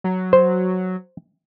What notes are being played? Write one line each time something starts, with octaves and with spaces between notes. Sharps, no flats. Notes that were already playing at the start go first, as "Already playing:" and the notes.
F#3
C5